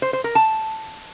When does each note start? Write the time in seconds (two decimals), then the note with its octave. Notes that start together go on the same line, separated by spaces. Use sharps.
0.02 C5
0.13 C5
0.24 A#4
0.35 A5